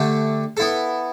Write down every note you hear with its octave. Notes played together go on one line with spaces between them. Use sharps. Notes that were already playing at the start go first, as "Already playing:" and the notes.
Already playing: D3 A3 G4 E5
B3 E4 A4